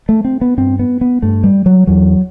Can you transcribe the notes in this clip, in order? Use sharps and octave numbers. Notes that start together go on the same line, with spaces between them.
A3
C4
B3
G2 C4
B3
B3
G2 A3
G3
F#3
E2 F#3